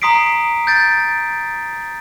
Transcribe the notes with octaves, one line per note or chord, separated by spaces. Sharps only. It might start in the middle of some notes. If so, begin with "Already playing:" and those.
A#5 C6 D#6 B6 C7 D7
G6 A6 D7